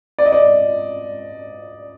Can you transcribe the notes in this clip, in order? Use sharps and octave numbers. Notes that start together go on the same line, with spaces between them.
D5
D#5
D5